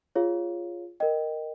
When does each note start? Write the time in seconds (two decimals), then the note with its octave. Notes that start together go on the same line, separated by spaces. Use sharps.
0.15 F4 G#4 C#5 F5
1.00 A#4 D#5 G5